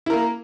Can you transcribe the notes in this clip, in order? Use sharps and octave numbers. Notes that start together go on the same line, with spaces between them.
A#3 E4 A#4